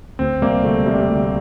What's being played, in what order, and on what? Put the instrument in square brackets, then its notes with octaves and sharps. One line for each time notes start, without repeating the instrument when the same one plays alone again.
[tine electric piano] D2 [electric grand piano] C4
[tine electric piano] C3 G3 [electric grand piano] A#3
[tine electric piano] D2 [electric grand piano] A3
[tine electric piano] C3 G3
D2